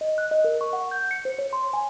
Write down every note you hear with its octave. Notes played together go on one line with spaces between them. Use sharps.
D#5
F#6
D#5
A#4
C#6
F#5
G6
C#7
C5
C#5
C6
G#5